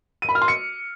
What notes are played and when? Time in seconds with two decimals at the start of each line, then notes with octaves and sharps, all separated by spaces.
0.22 D#7
0.29 B5
0.35 F6
0.42 C6
0.48 C#7